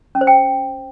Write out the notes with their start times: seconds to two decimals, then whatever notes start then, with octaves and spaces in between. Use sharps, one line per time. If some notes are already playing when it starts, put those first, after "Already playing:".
0.15 C#4
0.21 C5
0.27 G5